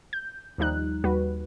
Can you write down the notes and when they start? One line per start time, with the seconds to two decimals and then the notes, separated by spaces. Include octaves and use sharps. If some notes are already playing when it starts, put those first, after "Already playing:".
0.13 G6
0.58 D#2 F3 G3 D#4 F#6
1.04 D#2 G3 F#4 B4